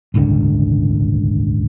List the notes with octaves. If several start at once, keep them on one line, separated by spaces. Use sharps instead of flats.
D#1 G#1 C#2 D3